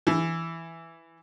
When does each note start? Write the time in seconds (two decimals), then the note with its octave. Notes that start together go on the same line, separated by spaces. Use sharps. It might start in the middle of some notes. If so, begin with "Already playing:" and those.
0.07 E3